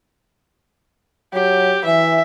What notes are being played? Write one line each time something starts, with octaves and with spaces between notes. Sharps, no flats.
F#3 G4
E3 E5